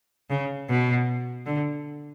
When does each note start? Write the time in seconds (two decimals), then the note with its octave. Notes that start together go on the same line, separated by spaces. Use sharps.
0.30 C#3
0.69 B2
1.46 D3